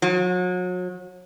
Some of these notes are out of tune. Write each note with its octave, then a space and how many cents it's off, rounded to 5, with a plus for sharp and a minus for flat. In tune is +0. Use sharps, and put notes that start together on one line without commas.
F#3 -35